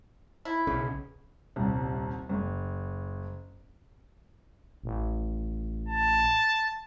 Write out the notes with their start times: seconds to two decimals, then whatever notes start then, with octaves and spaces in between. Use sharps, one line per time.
0.45 E4
0.67 B1 C#3
1.56 D#1 C2
2.29 F#1
4.84 A1
5.88 A5